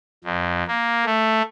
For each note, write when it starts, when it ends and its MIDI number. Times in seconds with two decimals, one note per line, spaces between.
0.24 0.64 41
0.67 1.05 58
1.05 1.42 57